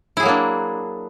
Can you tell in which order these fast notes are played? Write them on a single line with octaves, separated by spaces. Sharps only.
E4 G#4 F#3 A#3 D4